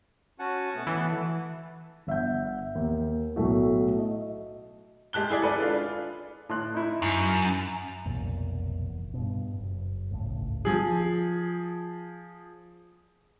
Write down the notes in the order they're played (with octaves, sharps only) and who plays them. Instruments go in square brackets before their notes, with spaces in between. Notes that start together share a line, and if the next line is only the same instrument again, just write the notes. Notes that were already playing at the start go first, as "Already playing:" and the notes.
[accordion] C#4 F#4 G#5 [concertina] F#5 A5
[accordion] B2 A3 B3
[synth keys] E3 [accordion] A3 B3
[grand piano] G1 E5 F#5 G6
D#2
B1 A2 A3 F#4
D#5
[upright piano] G#3 G4 A5 F#6 G7
E4 G#4 D5
A4 B4 D5
D4 F4
[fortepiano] A2 C6 F#6
D#4 E4
[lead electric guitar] F#2
[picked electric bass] F1 B1 E2 A#2
G2 B2
F#1
G#1 C#2 A2
[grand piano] F3 G#4